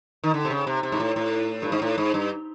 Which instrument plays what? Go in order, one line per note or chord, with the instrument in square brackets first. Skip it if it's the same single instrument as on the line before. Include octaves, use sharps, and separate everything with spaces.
[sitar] D#3
D3
C3
C#3
C3
C3
G#2
A2
A2
G2
G#2
A2
G#2
G2